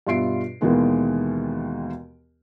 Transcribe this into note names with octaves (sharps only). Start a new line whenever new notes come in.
G2 B2 F4 E5 C7 D7
D#2 B2 D#3 E3 G#3 B3